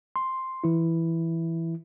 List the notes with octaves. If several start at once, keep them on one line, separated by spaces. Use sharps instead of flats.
C6
E3 E4